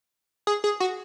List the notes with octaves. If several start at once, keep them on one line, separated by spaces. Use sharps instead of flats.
G#4
G#4
F#4